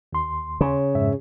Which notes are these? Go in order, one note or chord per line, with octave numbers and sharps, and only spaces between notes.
D#2 C6
C#3
F2 G#2 E5